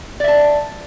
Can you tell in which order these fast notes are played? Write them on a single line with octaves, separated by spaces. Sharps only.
D5 E5 A5